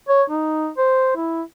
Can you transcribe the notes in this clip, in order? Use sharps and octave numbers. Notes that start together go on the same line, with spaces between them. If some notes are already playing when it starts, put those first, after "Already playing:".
C#5
D#4
C5
E4